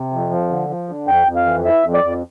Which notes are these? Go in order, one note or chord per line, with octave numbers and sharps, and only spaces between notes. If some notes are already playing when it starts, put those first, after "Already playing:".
Already playing: C3
F2
F3
D3
F3
D3
F2 G5
F2
F5
E3
E3 E5
F2
D5
F2